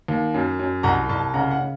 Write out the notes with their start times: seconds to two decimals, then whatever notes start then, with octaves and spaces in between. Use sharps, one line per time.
0.08 D#2
0.34 F#2
0.59 F#2
0.83 C2 F#5 A#5
1.09 C2 A5
1.21 A5
1.34 C#3 F#5 A#5
1.51 F#5
1.59 C#3